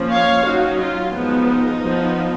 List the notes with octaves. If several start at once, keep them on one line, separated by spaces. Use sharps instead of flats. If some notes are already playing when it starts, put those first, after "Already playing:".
Already playing: F3 A#3 C#4
C#5 F5
F#3 C#4 D#4 F#4
F4
F3 G#3 B3 D#4
F3
B3